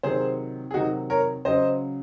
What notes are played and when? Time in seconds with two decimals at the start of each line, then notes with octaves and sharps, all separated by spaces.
0.03 C3 D#3 F#3 G#4 C5
0.71 G#4
0.74 C3 D#3 F#3 D#4 F#4
1.10 A#4 C#5
1.45 C#3 F#3 C5 D#5